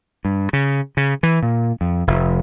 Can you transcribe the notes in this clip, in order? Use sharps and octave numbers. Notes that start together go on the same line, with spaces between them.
G2
C#3
C#3
E3
A#2
F2
F1